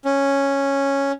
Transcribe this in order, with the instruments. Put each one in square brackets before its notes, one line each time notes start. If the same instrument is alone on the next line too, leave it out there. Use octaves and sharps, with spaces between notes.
[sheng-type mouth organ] C#4